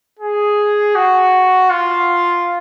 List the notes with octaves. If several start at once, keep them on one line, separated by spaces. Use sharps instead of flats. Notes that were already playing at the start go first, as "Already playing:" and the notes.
G#4
F#4
F4